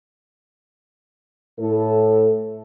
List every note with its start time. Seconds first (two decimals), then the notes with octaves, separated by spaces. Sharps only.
1.59 A2 A4